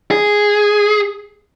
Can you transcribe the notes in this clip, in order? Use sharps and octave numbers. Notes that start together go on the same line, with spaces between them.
G#4